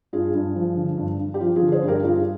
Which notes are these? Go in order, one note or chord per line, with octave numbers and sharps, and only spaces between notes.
G2 F4 G#4
G2
F3
D3
G2
G2
G4
F3 F4
F4 G#4
D3
G#4 C5
G2
G4 A#4
G2 F4 G#4